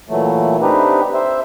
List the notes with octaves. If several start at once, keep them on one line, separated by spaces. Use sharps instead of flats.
A#2 E3 F#3 A3
C4 D4 D#4 G4 B4
C5 E5